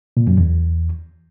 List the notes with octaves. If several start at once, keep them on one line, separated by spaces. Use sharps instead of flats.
A#2
F#2
E2